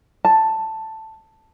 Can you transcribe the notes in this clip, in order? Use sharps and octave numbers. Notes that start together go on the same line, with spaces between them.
A5